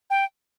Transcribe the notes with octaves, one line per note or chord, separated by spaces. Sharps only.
G5